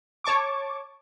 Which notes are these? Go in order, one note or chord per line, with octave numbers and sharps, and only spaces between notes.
C#5 A5 C#6 D6